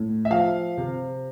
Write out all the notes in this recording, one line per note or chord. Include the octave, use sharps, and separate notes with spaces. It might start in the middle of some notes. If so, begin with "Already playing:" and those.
Already playing: A2
E5
F3 F5
C3